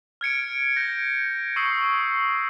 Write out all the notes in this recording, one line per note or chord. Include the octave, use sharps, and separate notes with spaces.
F6 G#6 C#7 D7
G6 A#6
C#6 D#6 E6 C7